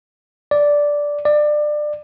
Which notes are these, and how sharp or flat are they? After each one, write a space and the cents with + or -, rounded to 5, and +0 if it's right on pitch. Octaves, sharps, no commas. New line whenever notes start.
D5 -5
D5 +25